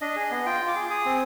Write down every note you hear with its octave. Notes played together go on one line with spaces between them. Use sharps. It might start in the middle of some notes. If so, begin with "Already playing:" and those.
D4 D#5
G#4
B3
F4 G5
F4
D6
G#4
G#4 D#6
C4